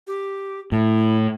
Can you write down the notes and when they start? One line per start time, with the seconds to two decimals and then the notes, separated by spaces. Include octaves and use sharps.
0.07 G4
0.72 A2 E4